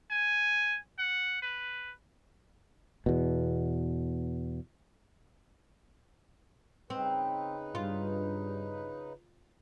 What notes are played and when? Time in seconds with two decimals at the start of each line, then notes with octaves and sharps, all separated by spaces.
0.11 G#5
0.99 F#5
1.42 B4
3.06 E2 B2
6.90 C#3 C4 D#4 B4
7.75 G2 F4